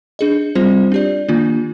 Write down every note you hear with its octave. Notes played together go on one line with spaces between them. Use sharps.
D4 G#4 D#5
G3 C4 F4 C5
D4 G4 D5
D#3 A#3 D4 F4